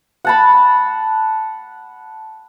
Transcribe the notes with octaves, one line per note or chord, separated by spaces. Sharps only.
F#5 A5 B5